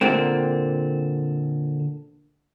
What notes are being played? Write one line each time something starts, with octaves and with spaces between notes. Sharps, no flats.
A#2 D3 A#3 C4